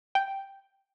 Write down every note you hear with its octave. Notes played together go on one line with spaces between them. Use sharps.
G5